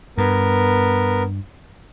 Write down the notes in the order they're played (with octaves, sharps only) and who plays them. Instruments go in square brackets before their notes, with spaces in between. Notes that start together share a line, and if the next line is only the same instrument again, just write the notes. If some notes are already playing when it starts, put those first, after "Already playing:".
[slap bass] G2 [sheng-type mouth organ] B3 A#4